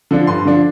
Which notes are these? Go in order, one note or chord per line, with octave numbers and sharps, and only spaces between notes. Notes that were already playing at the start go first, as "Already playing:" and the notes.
D3 F3 D4
G2 C6
D3 F3 D4